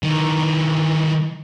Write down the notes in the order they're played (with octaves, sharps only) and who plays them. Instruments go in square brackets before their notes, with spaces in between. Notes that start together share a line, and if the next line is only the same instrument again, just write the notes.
[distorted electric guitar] D#3 E3